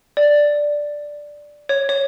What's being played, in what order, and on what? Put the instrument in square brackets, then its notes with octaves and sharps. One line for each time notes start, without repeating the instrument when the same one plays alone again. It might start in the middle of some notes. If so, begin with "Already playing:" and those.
[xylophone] D5
C#5
C#5